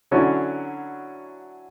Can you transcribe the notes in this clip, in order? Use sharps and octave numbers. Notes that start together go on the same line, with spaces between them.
D3 F#3 C#4 D4 E4